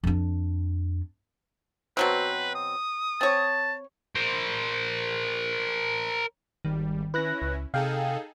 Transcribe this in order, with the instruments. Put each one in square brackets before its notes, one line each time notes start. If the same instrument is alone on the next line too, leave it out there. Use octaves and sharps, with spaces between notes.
[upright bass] F2 D4
[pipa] B2 F#3 C4 [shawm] B4
[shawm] D#6
[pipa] C4 C#5 [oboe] A5
[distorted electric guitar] A#4 C5
[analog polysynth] G#1 G3 [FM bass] D#3
[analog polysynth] C#4 E4 [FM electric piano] B4 F#6 A#6
[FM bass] C#2
[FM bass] C3 [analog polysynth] D#4 G#4 A4 [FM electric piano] F5 G5